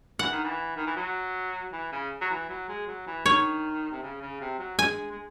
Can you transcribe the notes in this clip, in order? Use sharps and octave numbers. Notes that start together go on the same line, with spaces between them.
E3 F#5
D#3
E3
D#3
E3
F#3
E3
C#3
F#3
E3
F#3
G#3
F#3
E3
D#3 C#5
C3
C#3
C#3
C3
F#3
G#3 G#5
G#3